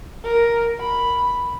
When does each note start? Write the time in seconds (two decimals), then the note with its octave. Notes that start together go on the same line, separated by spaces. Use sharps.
0.24 A#4
0.80 B5